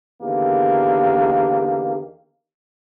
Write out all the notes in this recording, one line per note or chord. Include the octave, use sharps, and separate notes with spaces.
E2 D3 D#3 A#3 G4